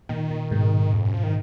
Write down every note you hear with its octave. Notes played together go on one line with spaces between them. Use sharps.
A#2 D#3
A#2
G#2 B2
F2
F#2
F3
D#3